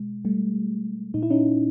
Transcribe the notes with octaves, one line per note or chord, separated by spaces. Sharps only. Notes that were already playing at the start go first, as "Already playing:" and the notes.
Already playing: B2 G#3
G3 A3
A#2 D#4
E4
C#4 D#4